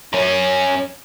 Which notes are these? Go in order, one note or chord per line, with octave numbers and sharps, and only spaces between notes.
F#2 C#4